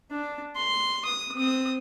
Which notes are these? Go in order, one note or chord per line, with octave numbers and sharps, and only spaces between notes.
D4
C6
D#6
C4 D#6